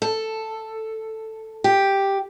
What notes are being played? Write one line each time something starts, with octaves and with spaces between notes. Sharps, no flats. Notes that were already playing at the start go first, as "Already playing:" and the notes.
A4
G4